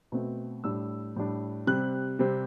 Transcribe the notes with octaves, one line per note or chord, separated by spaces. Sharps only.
B2 A3 C4
A2 G3 D4 E6
A2 G3 D4
C3 G3 C4 F#6
C3 G3 C4